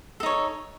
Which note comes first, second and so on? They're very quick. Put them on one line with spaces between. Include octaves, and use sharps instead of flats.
A4 D#4 C#5